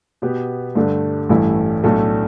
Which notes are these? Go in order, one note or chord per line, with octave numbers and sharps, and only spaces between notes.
B2 B3 G4 B4
G2 D3 A3 D4 G4
A1 G2 E3 A3 E4
B1 A2 A3 D4 A4